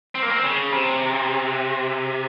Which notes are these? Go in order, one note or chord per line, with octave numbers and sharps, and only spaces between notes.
C4
A#3
C4
C#3
C3